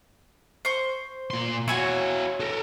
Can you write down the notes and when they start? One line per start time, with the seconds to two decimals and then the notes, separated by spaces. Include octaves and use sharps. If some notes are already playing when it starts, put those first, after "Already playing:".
0.65 C5 C#6
1.30 A#2 C6
1.68 E4 F#4 C#5 G#5 C#6
2.40 A4 A#4